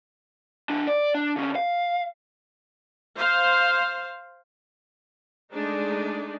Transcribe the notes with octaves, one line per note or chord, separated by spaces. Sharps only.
E3 D4
D5
D4
D3 C#4
F5
C5 F5
G#3 A3 D4 D#4